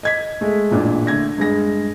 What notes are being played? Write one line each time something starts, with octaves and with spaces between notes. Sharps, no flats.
D#5 G#6 B6
G#3 A3
A1 A#2 D4
D3 A3 G#6 A#6
G2 G#3 A#6